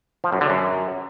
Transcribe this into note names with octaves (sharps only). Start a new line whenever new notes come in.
F3
F#2
D3
F#2